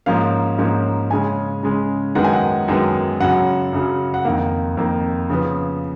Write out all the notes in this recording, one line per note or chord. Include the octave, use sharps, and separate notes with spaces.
G#2 F3 A#3 C#4 F5
G#2 F3 A#3 C#4
C#3 G#3 C#4 G#5
C#3 G#3 C#4
F#2 D#3 G#3 B3 F#5
G#5
F#5
F#2 D#3 G#3 B3
F#2 C#3 F#3 F#5
F#2 C#3 F#3
F#5
F2 D#3 A#3 F5
F2 D#3 A#3
C#3 F3 B3